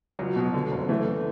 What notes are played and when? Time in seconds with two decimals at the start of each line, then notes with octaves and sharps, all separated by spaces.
0.19 C#2 F#3
0.36 B2
0.54 D3
0.71 F#1
0.89 E3 A3